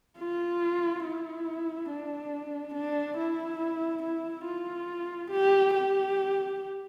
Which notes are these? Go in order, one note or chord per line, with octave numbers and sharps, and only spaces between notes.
F4
E4
D4
D4
E4
E4
F4
G4
G4